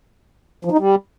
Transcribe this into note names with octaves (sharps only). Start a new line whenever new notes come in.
F3
D#4
G3